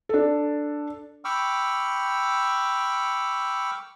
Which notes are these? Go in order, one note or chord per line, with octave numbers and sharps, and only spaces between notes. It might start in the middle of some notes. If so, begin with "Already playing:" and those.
D4 A4
G5 B5 C#6 D6 E6 F6